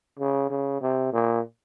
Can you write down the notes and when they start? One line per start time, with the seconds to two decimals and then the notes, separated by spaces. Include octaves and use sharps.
0.19 C#3
0.50 C#3
0.81 C3
1.13 A#2